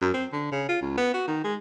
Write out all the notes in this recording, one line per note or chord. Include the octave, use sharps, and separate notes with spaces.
F#2
C4
D3
C#3
F4
C#2
B3
F#4
D#3
G#3